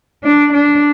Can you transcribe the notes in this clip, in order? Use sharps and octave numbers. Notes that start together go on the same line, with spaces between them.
D4
D4